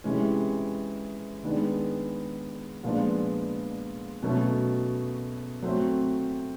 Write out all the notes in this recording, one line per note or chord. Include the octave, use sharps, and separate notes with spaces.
C3 E3 G#3 C#4
D#3 G#3 B3 D4
A#2 F3 G#3 B3 D4
B2 F#3 A3 C#4
F#3 A3 C4